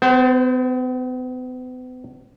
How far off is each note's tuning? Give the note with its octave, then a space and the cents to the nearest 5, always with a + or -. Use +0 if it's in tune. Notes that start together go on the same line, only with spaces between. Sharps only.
B3 +45 C5 +0